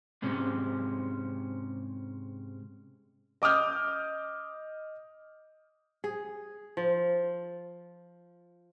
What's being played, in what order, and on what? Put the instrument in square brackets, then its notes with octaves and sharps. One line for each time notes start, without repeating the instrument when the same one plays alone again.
[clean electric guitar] G#2 C3 G#3 C#4
[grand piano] D#5 D6 D#6 F6 G6
[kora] G#4
F3